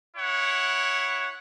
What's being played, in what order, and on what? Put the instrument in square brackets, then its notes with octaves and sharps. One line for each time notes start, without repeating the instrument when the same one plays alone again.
[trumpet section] E4 C#5 F#5